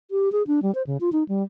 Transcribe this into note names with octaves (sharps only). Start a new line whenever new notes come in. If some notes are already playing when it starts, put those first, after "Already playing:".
G4
G#4
D4
G3
C5
C#3
F4
D#4
G3